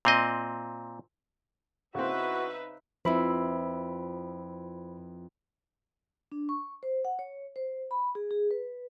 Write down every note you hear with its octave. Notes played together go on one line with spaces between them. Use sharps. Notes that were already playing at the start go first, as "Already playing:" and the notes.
A#2 C4 D#5
C#3 C4 D#4 E4 F#4 B4 E5
F2 F3 E4 B4 C5 B5
D4
C#6
C5
F#5
C#5
C5
B5
G#4
G#4
B4